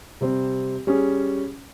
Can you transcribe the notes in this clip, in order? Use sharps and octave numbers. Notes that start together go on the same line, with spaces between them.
C3 G3 C4
G3 C#4 G#4